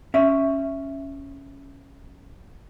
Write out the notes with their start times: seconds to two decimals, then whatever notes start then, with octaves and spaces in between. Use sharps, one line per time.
0.14 C#4 E5